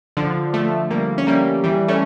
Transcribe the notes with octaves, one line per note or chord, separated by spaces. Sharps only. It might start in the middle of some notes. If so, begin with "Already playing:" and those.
D3 F3
F3 A3
G3 A#3
C#4
G3 A#3
E3 G3
A3 C#4